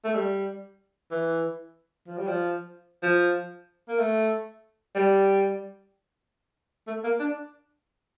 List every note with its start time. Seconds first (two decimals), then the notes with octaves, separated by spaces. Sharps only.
0.04 A3
0.15 G3
1.11 E3
2.07 F3
2.17 G3
2.27 F3
3.03 F3
3.88 A#3
3.99 A3
4.95 G3
6.87 A3
7.04 A#3
7.19 D4